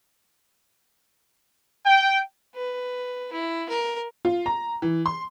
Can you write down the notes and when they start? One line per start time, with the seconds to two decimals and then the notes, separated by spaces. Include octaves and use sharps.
1.85 G5
2.55 B4
3.33 E4
3.69 A#4
4.25 F4
4.46 A#5
4.82 E3
5.06 C6